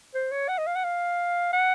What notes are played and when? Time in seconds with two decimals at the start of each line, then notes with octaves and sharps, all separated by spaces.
0.15 C5
0.32 C#5
0.49 F#5
0.58 D#5
0.67 F5
0.76 F#5
0.84 F5
1.53 F#5